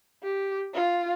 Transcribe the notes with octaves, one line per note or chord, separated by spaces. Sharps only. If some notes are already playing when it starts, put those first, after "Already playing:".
G4
F4